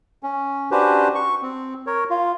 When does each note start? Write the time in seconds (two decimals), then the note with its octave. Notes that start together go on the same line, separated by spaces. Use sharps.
0.23 C#4
0.71 C#4 D4 F#4 G4 B4 C5
1.15 C#6
1.42 C4
1.87 A#4 C#5
2.10 F4